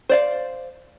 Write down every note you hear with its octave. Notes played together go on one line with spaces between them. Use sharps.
C5 D5 F5